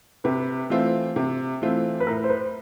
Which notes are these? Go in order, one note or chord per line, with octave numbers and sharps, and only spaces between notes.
C3 B4
E3 A3 C4 F4
C3
E3 A3 C4 F4
B4
A2 A#4
C5
B4